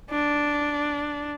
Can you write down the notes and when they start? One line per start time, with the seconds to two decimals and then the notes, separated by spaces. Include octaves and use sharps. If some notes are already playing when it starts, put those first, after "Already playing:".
0.10 D4